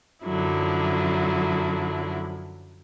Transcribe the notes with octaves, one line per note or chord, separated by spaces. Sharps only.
F#2 D3 F3 F#3 E4